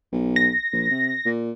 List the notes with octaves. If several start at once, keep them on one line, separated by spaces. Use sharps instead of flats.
B1
A#6
A#1
C3
A#2